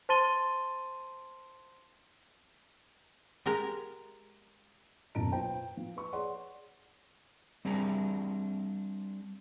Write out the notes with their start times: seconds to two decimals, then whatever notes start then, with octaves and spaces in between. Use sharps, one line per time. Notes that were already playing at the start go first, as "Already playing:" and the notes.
0.09 C5 A5 C6 A6 D#7 G7
3.46 G#3 G4 A#4 A#5
5.15 D#1 B1 F#2 A5 A#5 D7
5.32 F4 B4 C5 G5
5.77 F3
5.97 B4 C#6
6.12 G#4 C#5 D5 F#5 C6
7.65 G3 C4 D4 G#4 A#5